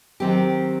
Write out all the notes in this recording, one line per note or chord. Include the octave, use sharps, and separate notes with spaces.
D#3 F#3 C4 G4